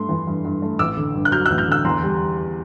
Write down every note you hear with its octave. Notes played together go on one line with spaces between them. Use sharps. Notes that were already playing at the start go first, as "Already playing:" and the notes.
Already playing: G2 A3 C6
E3
G2
G2
A3
A1 D6 E6
D3
G2
F#6
F#3 F6 G6
E6 F#6
A1
F6 G6
D3 E6 F#6
E2 A#5 C6
G3